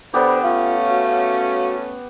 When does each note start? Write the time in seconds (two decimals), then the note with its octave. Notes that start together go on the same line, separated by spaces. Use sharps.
0.14 D3 B3 G4 C5 B5
0.43 A3 C#4 F4 F5
0.89 F#4